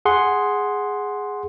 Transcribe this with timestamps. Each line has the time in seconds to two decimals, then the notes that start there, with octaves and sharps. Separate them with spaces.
0.05 G#4 F#5 C6